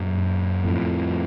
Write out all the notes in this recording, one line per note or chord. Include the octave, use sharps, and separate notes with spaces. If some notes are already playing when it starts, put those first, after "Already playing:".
Already playing: F#2 A#2
F2 A2